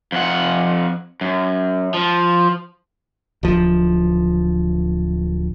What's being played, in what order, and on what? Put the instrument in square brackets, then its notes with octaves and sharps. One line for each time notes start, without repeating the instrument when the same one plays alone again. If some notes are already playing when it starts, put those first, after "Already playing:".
[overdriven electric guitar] F2 F#5
F#2
F3
[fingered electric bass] D1 F3